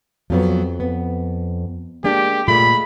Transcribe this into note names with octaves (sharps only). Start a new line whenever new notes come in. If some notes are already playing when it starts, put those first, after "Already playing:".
F2 F3 F#3 B3
B3
G#3 A#3 D4 G4
A#2 G#3 A3 F4 B5